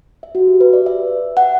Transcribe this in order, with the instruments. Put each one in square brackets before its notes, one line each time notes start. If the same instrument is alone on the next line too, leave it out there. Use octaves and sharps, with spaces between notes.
[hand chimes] E5
F#4
G4
B4
D5
E5
F#5